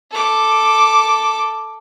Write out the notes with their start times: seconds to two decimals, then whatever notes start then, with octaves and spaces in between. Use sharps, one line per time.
0.11 A4 D6